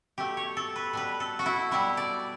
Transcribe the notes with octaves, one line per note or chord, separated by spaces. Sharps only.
B2 A3 G4
C#5
A4
B4
B2 G3 B4
A4
F#4
E4
B2 G3 E4
D5